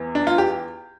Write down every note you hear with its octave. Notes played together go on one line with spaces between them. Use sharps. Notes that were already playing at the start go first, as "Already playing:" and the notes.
Already playing: E2 E3
D4
F4
G4